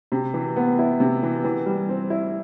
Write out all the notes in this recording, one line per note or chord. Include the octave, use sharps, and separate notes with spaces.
C3
E3
B3
E4
C3
E3
E3
G3
C4
E4